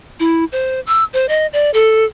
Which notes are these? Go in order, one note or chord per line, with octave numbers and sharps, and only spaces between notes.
E4
C5
E6
C5
D#5
D5
A4